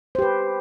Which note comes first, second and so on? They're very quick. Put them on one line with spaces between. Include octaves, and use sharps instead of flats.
C5 G4 B4